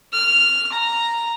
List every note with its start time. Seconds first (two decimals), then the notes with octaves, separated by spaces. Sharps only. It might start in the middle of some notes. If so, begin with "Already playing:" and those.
0.13 F6
0.72 A#5